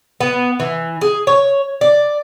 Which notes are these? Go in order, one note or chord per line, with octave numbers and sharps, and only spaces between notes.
B3
E3
G#4
C#5
D5